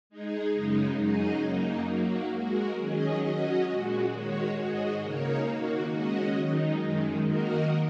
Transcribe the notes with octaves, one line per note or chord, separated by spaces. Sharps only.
G#3 D#4 G#4
F#2 C#3 G#3 D#4
F#2 F#3 D#4 G#4 D#5
F#2 F#3 A#3 D#4
F#3 A#3 F#4
G#3 F#4 A#4
D#3 F#3 C#4 G#4 D#5
F#3 C#4 F#4 D#5
A#2 G#3 F#4
D#3 G#3 F#4 C#5
G#2 G#3 F#4 D#5
C#3 A#3 D#4 A#4 C#5
D#3 A#3 F#4
G#3 C#4 F#4 D#5
D#3 F#3 D#4
F#2 D#3 G#3
D#3 A#3 F#4 A#4 D#5